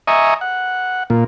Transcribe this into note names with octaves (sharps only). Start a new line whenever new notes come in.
D#5 E5 G#5 A#5 C#6 D#6
F#5
A#2 A#3 F4